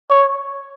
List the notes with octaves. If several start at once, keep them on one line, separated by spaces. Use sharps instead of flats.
C#5